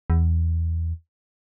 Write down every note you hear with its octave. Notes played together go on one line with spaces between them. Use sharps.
E2